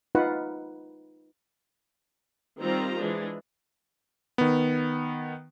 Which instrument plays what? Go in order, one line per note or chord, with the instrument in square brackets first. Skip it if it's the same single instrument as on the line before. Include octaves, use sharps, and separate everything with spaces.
[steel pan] D#4 F4 B4 F#5
[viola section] D#3 G3 C4 F4 C5 A#5
E3 G#3 D4
[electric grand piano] D#3 B3